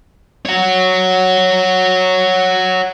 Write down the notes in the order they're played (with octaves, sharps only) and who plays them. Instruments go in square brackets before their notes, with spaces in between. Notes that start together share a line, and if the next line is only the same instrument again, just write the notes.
[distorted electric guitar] C#5 F#5